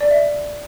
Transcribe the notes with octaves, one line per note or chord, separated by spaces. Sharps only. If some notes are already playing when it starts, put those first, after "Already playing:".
D5
E5